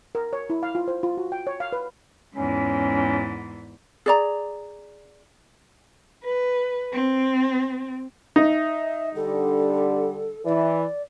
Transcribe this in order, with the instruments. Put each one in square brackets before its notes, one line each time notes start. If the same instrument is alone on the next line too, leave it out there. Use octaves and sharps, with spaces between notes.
[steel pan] A#4
C#5
E4
F5
F4
C5
F4
F#4
G5
C#5
F5
B4
[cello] E2 G#2 [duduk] C#4
[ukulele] G#4 D5 A#5
[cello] B4
C4
[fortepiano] D#4 [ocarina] E5
[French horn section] D3 G3 [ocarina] A4
[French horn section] E3 [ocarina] D5